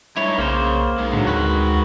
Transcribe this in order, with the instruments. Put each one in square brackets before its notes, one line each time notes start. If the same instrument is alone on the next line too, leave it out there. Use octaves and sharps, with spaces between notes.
[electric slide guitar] G2 D#4 [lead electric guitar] E4 C#5
[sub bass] B1 [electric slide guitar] C#3 [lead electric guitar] A#3 C5
[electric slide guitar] D#3 G#3
[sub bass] A2 [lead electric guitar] D3 F#3
[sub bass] D2 [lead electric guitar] F#4 B4